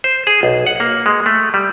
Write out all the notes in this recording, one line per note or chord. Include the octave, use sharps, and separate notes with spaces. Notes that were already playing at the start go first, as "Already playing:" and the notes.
C5
G#4
B1
F#5
A#3
G#3
A3
G3